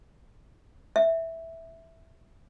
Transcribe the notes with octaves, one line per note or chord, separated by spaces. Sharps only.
E5